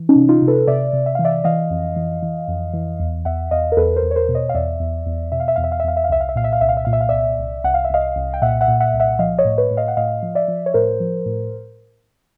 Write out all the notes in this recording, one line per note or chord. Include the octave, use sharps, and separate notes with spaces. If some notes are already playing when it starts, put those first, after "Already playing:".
Already playing: E3
C#4 D#4
C3
D#4 F4
C3
A4 B4
C3 D5 E5
C3
E5
E3 F5
D5 E5
E3 D#5 F5
F2
E3
E3
F2
E3
E2
E2 E5 F#5
E2 D#5 F5
A#4
E2 A4 B4
A#4 C5
E2
C#5
A#4 C5
B2
C#5 D#5
F5
E2 D5 E5
E2
E2
B2 E5
F5
E5
E2 F5
E5
F5
E5
E2 F5
E5
F5
C2 E5
F5
E5
A#2 F5
E5
F5
C2 E5
F5
E5
A#2 F5
E5
F5
C2 D5 E5
C2
C2 F#5
F5
E5
C2 D#5 F5
C2
G5
A#2 E5 F#5
E5 F#5
A#2
E5 F#5
C2
E5 F#5
F3 D#5 F5
C#5 D#5
A2
B4 C#5
A2
D#5 F5
F#5
A2 D#5 F5
F3
D5 E5
F3
C#5
A2 A#4 C5
F3
A2